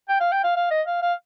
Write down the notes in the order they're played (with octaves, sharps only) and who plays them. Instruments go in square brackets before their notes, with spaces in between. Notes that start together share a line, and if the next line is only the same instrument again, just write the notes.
[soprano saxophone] G5
F5
G5
F5
F5
D#5
F5
F5